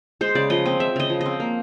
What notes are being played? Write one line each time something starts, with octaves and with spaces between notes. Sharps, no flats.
G#3 C5
C#3 D5
F3 D#5
C4 D#5
G#3 E5
C#3 D#5
F3
C4 D#5
A#3